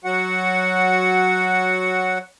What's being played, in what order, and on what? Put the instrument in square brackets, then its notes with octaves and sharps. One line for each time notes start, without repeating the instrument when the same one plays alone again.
[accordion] F#3 F#4 F#5